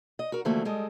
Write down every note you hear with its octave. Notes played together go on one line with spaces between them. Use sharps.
D#5
F#4 A#4
D3 E3 F3 A3 A#3 F#4
G3 G#3 A4 D#5